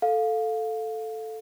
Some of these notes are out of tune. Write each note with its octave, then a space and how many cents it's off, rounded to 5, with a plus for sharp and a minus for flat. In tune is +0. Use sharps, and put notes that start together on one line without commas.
A4 +0 F5 +10